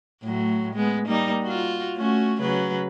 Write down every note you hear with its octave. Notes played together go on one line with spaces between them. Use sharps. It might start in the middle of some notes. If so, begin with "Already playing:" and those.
A2 F#3 A3
G#3 B3
G3 A#3 D#4
F4 F#4
A3 C#4 F#4
C#3 F#3 B4